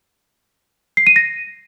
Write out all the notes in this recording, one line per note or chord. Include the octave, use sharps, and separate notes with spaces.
C7
D#7
A#6